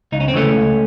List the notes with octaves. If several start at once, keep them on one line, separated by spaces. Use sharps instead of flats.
C#2 D#4
C#4
C4
C#3 E3 A3 C#4
C#2